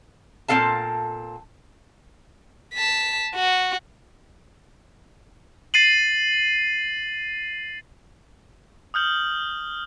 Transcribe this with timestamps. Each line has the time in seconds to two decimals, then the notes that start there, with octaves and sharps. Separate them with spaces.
0.48 A#2 C4 A4 F5 A5
2.74 A5 B6
3.35 F#4
5.74 A6 C7 D#7 F#7
8.94 D#6 F6 G6 F#7